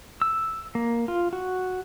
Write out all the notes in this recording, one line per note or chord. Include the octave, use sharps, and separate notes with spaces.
E6
A#3
F4
F#4